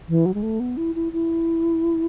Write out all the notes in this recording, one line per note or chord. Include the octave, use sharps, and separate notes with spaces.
E3
F#3
G#3
A3
B3
E4
E4
E4